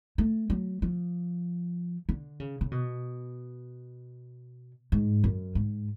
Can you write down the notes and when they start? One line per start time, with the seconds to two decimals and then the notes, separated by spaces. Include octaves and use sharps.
0.18 A3
0.50 F#3
0.82 F3
2.09 D3
2.40 C#3
2.61 C#3
2.71 B2
4.92 G#2
5.24 F#2
5.55 G#2